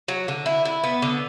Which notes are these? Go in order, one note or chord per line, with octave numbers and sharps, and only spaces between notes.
F#3
D3
E4
E4
B3
D3